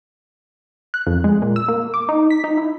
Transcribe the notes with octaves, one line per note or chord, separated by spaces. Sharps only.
F#6
F2
G#3
A#2
E6
A#3
D6
D#4
B6
D#4
E4